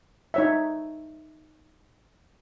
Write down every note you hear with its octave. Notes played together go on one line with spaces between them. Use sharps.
D#4 C#5 E5